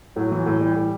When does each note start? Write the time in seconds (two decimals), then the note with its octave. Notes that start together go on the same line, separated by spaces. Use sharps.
0.16 A2 F#3
0.31 E3
0.46 A2
0.60 E3 G3
0.76 A2